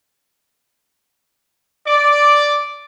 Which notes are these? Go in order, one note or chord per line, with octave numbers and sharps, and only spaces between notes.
D5 D6